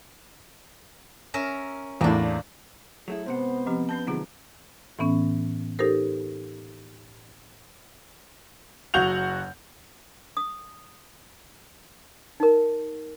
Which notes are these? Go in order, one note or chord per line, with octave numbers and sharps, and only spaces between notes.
C#4 A#4 E5
E2 A2 A#3 D4
F#3 A3 E4 G#4
G#2 C3 B3 C5 F#5
F3 C4 G4
C#4 B4 A5 G6
C3 D#3 F#3 A3 C4 F4 G#4
A2 E3 B3 C#4
D#4 G4 A4 A#4 C5
F#1 F#3 F#4 F#5 G6 F7
D#6
D#4 A#4